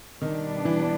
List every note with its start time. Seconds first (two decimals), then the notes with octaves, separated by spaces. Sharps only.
0.21 B2 D#3 G3 B3 D4
0.65 E3